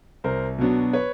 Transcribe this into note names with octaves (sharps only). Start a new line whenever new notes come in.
C2 A#4 C5
B2 F#3 B3 D4
B4 C#5